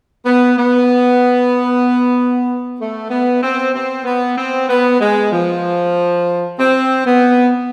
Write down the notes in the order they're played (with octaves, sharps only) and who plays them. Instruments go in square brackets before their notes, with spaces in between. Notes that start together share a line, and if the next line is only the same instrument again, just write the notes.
[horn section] B3
B3
A3
B3
C4
C4
B3
C4
B3
G#3
F3
C4
B3